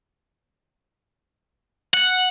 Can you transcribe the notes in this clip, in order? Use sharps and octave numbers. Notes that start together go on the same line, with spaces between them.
F#5